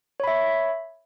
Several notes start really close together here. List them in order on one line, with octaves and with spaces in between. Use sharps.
C#5 B5 E5